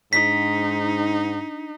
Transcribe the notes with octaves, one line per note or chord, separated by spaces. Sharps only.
G#2 D4 D#4 B6